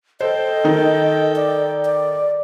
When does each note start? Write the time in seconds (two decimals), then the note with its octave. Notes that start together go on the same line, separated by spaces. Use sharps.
0.21 A4 C5 D#5 G5
0.64 D#3 D#4
1.36 D5
1.85 D5